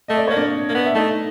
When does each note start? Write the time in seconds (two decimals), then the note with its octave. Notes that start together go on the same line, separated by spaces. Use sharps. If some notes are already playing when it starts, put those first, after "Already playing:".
0.08 A3 D#5
0.17 D5
0.27 A#3 C#5
0.37 D4 D5
0.69 A#3
0.74 B3
0.86 E5
0.95 A3 D#4 D#5